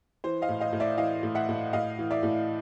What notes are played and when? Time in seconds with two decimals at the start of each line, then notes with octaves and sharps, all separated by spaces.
0.24 E3 C5
0.42 D#5 F5
0.49 A2
0.60 D#5 F5
0.73 A2
0.80 D5 E5
0.98 E3 D#5 F5
1.23 A2
1.35 E5 F#5
1.49 A2
1.73 A2 D#5 F5
1.98 E3
2.11 D5 E5
2.23 A2